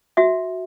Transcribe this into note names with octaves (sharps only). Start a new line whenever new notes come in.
F#4 E5